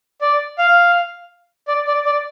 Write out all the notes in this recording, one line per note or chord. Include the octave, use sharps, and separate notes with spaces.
D5
F5
D5
D5
D5